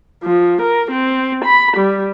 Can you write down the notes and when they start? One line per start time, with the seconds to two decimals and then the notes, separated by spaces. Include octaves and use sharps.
0.24 F3
0.62 A#4
0.91 C4
1.45 B5
1.77 G3